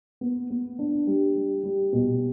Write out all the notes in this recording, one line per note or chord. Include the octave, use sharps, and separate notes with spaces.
B3
B3
D4
G3
G3
G3
B2